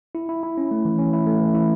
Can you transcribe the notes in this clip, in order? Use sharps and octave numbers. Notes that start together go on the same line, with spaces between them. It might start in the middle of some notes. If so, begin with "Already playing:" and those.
E4
E4
E4
C#4
A3
E3
C#4
E4
A3
E3
E4